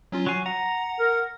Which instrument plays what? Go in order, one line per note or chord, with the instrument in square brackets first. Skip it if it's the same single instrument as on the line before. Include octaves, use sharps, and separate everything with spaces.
[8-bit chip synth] F#3 C#4 F4
[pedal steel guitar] F#3 G#5 [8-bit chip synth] C#6 C7
[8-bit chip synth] F#5 [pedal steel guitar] A#5
[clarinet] A#4